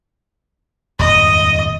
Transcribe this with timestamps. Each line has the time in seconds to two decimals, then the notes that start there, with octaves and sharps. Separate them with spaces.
0.99 D#1 F2 G#2 D#5